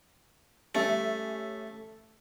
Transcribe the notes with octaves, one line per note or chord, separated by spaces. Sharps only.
G3 A3 C#4 E5